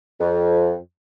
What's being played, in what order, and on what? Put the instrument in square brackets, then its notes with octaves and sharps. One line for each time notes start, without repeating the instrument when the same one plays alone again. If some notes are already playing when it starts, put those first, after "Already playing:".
[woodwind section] F2